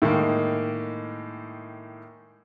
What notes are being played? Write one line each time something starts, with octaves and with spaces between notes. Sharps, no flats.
A2 D#3 G#3 A#3